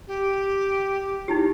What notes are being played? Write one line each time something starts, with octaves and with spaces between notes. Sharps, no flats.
G4
D#4 E4 G4